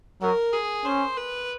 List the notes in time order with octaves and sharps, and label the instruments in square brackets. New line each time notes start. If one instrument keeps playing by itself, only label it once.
[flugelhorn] F#3 [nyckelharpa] A#4
[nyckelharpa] G#4
[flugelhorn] C#4 [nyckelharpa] C5
[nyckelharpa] B4